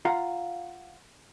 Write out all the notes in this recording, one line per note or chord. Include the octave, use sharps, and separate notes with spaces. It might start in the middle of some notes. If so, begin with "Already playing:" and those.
F4 F5 F#5 A#5